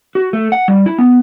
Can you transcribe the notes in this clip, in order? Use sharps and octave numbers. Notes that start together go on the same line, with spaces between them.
F#4
A3
F#5
G3
E4
B3